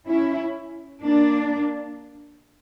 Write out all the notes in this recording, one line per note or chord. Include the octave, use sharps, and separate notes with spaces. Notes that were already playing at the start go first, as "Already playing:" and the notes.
C#4 E4
A#3 D4